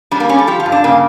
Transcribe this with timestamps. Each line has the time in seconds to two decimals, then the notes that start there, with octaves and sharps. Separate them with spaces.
0.11 G3 D4
0.20 A#3
0.29 G3 C#4
0.39 A4
0.47 F3 G4
0.60 F4
0.66 G2
0.72 D4
0.84 C#3 A#3